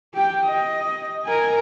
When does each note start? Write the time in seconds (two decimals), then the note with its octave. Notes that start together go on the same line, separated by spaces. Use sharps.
0.14 G4 G5
0.45 D#5
1.25 A#4 G#5